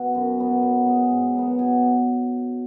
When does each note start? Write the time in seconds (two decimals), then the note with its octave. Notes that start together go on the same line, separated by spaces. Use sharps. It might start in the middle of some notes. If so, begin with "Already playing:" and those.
Already playing: B2 B3 F#5
0.15 F#2
0.39 F#3 B3
0.63 B2
0.86 G#3 B3
1.11 G#2
1.35 F#3 B3
1.59 B2 G#5